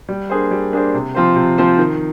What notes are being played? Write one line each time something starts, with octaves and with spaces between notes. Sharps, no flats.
G3
A#3 D4 G#4 C5
G3
A#3 D4 G#4 C5
C3
F3 C4 F4 C5
C3
F3 C4 F4 C5
D#3